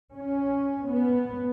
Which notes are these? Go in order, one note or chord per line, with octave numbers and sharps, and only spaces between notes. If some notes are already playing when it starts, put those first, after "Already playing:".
C#4
B3